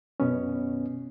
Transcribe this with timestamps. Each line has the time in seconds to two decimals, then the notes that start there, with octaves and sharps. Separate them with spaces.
0.20 F#2 B2 B3 C#4